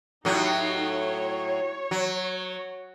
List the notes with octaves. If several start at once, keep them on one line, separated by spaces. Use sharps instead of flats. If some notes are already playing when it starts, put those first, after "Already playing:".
A2 F#3 D#4 G4
C#5
F#3